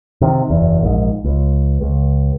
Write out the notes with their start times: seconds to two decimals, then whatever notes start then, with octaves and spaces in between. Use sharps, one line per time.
0.21 C3 D#3
0.50 F#1 E2
0.81 A#1 G#2
1.24 C#2
1.81 C#2